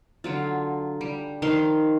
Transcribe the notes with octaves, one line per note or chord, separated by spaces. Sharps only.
D3 F#3 F4
G3
D#3 F3 F5 C6